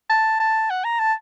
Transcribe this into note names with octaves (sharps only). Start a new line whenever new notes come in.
A5
A5
F#5
A#5
A5